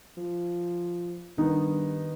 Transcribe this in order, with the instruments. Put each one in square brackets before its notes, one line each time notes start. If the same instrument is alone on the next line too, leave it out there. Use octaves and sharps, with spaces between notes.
[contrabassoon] F3
[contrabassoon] G2 [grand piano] D#3 B3 D#4